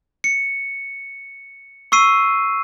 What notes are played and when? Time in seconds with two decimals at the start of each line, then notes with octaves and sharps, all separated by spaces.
0.24 C#7
1.92 C#6 E6 C7 D#7